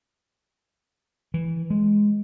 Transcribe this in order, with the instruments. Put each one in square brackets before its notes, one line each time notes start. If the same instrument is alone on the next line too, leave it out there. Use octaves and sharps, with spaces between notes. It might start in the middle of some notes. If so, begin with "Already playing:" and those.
[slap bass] E3
G#3